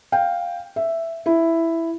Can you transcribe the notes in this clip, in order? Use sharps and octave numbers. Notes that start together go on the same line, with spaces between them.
F5 G5
E5
E4